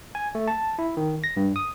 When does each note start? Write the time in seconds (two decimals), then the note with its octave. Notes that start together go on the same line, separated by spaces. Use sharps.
0.15 G#5
0.35 A3
0.48 A5
0.79 E4
0.97 D#3
1.24 A#6
1.37 G2
1.56 D#6